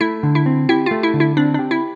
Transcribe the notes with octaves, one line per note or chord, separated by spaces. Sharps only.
A3 E4
D3
E4
C4
E4 G4
A3 F4
E4
D3
E4
C4 D4
D4 G4
E4